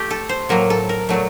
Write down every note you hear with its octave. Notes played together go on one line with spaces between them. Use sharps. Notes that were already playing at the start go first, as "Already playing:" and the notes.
Already playing: A3 G4
A4
C5
A2 F#3 A#3 A#4
A4
A#4
A#2 F#3 A3